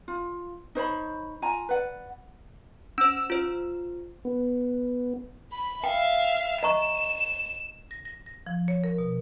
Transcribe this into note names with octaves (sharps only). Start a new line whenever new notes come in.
F4
D#4 C5 C#5 B5
F4 G#5 A#5
B4 D5 F#5
C#4 C5 E6
F4 C5
B3
B5
E5 F5 G5
D#5 A#5 C#6 E7
A#6
A#6
A#6
F3
C#5
A#4
B2